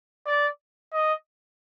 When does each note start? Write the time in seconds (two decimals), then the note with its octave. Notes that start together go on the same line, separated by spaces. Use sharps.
0.27 D5
0.93 D#5